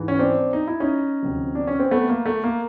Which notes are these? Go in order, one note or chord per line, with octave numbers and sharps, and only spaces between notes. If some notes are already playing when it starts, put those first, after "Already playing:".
Already playing: G#2 E3
C#4
C4 D4
D#4
E4
C#4 D#4
D2 C3 F3
D4
C#4
C4
A3 B3
A#3
A3
A#3